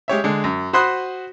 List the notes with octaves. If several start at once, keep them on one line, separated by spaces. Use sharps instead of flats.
G#3 G4 C#5 E5
D3 G#3
F#2
F#4 C5 B5 C6 D#6 F#6